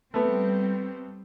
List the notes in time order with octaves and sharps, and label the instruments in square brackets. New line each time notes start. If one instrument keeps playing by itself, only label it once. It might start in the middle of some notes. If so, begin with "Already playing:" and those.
[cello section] G3 C4 [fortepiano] A3 B3